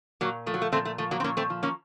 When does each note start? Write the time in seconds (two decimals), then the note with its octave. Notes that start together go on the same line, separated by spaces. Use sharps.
0.21 A#2 F#3 A#3
0.46 F3 A3
0.54 F#3
0.62 A3
0.72 A#2 A3 C4
0.85 A3
0.98 F3 A3
1.11 F#3 A#3
1.20 C4
1.24 A#2 A#3 C#4
1.37 A3 C4
1.50 F3
1.63 A#3 C#4